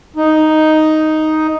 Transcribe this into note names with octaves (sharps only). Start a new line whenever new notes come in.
D#4